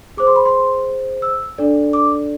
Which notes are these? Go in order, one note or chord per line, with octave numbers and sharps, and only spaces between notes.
G#4 C5 D6
C6
B5
C6
E6
D4 A4 D5
D6